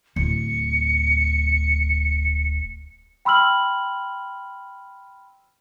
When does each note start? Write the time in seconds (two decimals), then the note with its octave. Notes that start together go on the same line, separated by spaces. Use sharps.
0.16 D1 C#7
3.25 G5 B5 C6 E6 F6 F#7